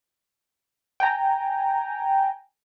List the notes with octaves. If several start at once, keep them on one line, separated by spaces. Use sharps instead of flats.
G5 G#5 A#5